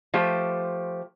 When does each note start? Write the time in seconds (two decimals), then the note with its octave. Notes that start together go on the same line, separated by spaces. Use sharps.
0.14 F3 A3 G4 C5